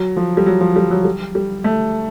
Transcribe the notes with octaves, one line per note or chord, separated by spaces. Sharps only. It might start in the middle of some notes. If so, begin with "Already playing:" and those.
Already playing: F#3
F3
G3
F#3
F3
G3
F#3
G3
G3
A3